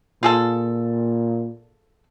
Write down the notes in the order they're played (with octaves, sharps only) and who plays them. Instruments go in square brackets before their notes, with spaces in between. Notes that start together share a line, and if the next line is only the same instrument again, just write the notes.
[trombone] A#2 [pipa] F4 G#4 A4